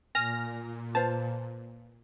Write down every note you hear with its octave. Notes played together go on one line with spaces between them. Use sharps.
A#2 G#5 F6 A#6
B4 C5 F5 A5